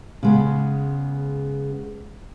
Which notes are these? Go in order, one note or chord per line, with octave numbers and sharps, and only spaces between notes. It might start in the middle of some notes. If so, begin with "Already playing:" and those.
C#3 G#3 B3